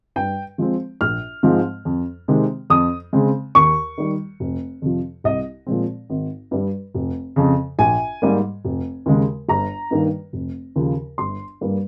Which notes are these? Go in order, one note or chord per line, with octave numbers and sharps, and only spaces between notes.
G2 G5
F3 G#3 C4
A#1 F6
G#2 F3 G#3 C4
F2
C3 D#3 G#3 C4
F2 D#6
C#3 G#3 C4
D#2 C#6
D#3 G3
F1
F2 C3 F3
C2 D#5
A#2 F3 G#3 C4
G#1
G2 G3
F1
F2 C#3
A#1 G#5
G#2 G3 A#3
F1
D#2 C#3 G#3
G1 A#5
G2 D#3 A#3
F1
D#2 C#3 F3
G1 C6
G2 G3 A#3